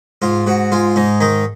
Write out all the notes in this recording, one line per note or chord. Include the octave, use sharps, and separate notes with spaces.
G#2 F4
G#2 F#4
G#3 F4
G#2 D#4
D#3 D#4